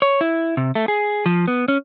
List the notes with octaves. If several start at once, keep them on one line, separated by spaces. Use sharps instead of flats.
C#5
E4
C3
A3
G#4
F3
B3
C#4